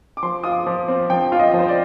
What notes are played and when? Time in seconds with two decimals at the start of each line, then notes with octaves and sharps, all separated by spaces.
0.17 D6
0.23 F3 C6
0.44 F4 D#6
0.52 D6
0.66 F3
0.88 C4
1.10 F3 G5
1.32 F4
1.39 D#5
1.54 F3
1.59 C5
1.69 D5